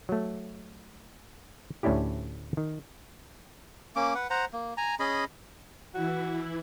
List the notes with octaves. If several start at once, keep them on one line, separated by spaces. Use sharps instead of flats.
F#3 A3
D2 A2 C#4 D4 E4 G4
D#3
A#3 C#4 D6
B4 F#5
C5 F#5 A#5
A#3
G#5 A#5
C#4 G#4 D#5 B5
E3 E4 F#4